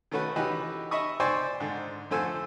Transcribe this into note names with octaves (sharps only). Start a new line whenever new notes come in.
D#3 A3 C#4 F#4 B4
E3 D#4 F#4 G4 B4
D#5 E5 B5 C#6 D#6
C5 D5 G5 G#5 C6 C#6
G#2 D3
F2 D3 A3 C5 G#5 E6